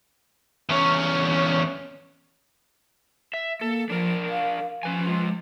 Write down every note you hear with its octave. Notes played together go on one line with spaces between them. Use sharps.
E2 C#4
E5
A#3 A4
F3 D4 A#4
F5
F3 C#4 B4 G#5
G#3 F4